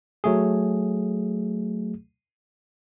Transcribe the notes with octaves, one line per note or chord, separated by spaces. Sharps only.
F#3 A3 G#4